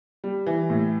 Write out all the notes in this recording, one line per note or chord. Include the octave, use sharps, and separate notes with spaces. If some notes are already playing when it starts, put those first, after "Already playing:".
G3
E3
A2